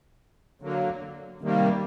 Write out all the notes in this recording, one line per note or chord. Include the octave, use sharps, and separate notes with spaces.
D3 F#3 A#3
C3 D#3 G3 A#3